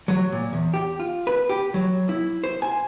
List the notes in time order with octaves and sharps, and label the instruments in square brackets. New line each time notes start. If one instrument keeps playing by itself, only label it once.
[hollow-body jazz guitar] F#3
A#2
E2
G4
F4
B4
G4
F#3
E4
C5
G#5